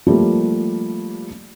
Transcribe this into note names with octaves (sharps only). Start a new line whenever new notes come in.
F3 G3 A3 A#3